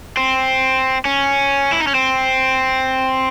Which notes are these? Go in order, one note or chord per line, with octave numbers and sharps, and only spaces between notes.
C4
C#4
E4
D#4
C#4
C4